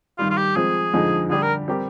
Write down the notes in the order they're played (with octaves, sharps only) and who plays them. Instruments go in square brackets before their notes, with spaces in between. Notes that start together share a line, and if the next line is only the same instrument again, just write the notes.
[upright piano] G2 D#3 G3 [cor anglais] F4
[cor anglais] F4
G4
[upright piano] F3 G#3 C4 [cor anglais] G#4
[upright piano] F2 D3 F3 G#3 D#4
[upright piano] D3 G3 D4 G4 [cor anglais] G#4
[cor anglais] A#4
[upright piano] G3 C4 G4 A#4